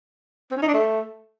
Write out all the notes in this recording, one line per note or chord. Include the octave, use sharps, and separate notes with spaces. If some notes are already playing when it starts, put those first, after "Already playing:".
C4
C#4
D#4
D4
A3